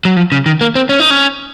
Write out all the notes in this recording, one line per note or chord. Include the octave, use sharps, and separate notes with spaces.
F#3
F3
C#3
D#3
A#3
C4
C#4
D#4
C#4